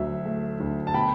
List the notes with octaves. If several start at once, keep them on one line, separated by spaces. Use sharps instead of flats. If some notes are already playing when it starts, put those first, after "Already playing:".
Already playing: D2 F#3 E5
A3
D2
A5
B2 G5 B5